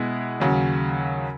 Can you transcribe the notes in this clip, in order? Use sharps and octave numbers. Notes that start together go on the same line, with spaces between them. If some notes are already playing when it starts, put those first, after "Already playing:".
Already playing: B2 G#3 B3 E4
D#2 C#3 F#3